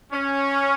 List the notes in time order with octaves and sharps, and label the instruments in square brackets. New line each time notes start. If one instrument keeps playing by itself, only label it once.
[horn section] C#4